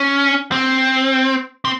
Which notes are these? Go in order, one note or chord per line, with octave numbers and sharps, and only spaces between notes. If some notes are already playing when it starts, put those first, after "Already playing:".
Already playing: C#4
C4
C4